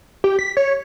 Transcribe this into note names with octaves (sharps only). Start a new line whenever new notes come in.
G4
B6
C#5